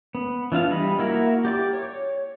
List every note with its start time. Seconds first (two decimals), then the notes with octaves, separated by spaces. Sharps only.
0.15 B3
0.52 E3 D4 F4 F5
0.70 G3 G#4 D#5 B5
0.99 A#3 E4 F#4 A#4
1.45 G4 D5 D6
1.73 C#5